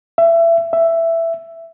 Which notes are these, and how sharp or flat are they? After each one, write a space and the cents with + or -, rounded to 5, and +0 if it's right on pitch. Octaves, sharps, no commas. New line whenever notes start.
E5 +25
E5 +10